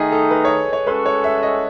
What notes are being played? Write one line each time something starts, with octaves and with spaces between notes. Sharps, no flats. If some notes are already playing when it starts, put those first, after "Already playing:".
Already playing: D#3 A3 D#4 G#4 D#5
A4
B4
C#5
C#5
G#3 C#4 F#4 A4 B4
C#5
E5
D#5